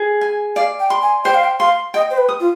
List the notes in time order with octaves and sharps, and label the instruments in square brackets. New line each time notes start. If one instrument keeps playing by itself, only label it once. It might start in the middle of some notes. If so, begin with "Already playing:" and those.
Already playing: [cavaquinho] G#4
G#5
[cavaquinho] D5 [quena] F5
[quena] G5
[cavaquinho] C6
[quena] G#5
[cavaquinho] C5 [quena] G5
[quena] F5
G5
[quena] F5 [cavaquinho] C6
[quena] D#5 [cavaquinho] G5
[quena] C5
B4
[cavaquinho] D#6
[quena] F4